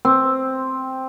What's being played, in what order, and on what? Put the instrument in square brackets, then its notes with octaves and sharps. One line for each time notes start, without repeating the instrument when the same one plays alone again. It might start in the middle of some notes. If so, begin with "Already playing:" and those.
[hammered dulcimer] C4